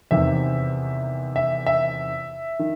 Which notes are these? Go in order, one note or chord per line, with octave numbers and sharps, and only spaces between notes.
E2 C3 D#3 E5
E5
E5
D#3